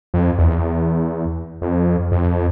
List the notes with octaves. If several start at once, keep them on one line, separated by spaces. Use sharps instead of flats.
F2
E2
F2
F2